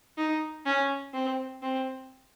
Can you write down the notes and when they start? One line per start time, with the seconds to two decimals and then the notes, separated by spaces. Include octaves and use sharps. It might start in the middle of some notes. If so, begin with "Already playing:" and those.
0.17 D#4
0.66 C#4
1.14 C4
1.62 C4